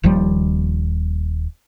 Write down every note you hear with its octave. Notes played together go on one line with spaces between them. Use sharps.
D#1 D#2 F3 G3